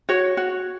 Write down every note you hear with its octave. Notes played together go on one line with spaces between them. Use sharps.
F#4 C#5
F#4